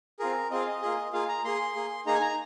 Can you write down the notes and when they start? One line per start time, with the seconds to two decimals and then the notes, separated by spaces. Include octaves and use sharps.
0.20 C4 F4 G#4 A#4
0.51 C4 F4 G#4 D#5
0.59 F5
0.67 D#5
0.82 A#3 F4 G#4
1.13 A#3 F4 G#4 F5
1.28 A#5
1.44 A#3 G#4 C6
1.76 A#3 G#4
2.06 A#3 D#4 G#4 A#5
2.14 G#5
2.22 A#5